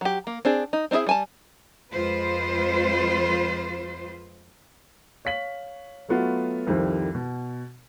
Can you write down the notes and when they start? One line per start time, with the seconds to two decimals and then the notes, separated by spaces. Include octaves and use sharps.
0.01 F#3 G4
0.27 A#3
0.45 C4 D4 G#4
0.73 D#4
0.91 C4 D#4 E4 G#4 E5
1.07 G3 G#5 A5
1.93 F2 G#3 F4 B4 C5
5.25 C#5 F5 B6 F#7
6.09 F#3 A3 B3 F4 F#4
6.67 C2 F2 D#3 G3 C5
7.15 B2